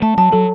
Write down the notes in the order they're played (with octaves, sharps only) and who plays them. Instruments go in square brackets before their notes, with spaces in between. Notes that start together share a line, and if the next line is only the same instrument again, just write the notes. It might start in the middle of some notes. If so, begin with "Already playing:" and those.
[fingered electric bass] A3 [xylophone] A5
[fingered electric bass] F#3 [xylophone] A5
[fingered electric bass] F#3 [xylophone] A4